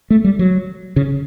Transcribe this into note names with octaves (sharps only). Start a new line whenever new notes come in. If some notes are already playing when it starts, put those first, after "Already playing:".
A3
G3
F#3
C#3